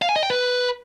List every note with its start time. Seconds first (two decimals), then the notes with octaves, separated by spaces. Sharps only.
0.02 F5
0.09 G#5
0.16 D#5
0.23 G5
0.30 B4